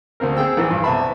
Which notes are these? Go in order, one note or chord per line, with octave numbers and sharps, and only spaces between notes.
D2 A#3 C4 A#4
C4 G#4 G5 E6
A#1 E3
G2
C2 B3 E5 A5 B5